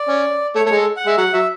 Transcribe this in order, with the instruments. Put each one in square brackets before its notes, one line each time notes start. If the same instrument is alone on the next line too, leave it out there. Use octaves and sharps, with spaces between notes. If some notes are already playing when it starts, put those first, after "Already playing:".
Already playing: [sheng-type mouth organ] D5
[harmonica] C#4
[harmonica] A3 [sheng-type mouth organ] C#5
[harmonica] A3 [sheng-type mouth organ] C#5
[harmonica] G#3
[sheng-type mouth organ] A4
F#5
[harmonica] G#3 [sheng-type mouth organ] E5
[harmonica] F#3 [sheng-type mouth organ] F#5
[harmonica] F#3 [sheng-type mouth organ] E5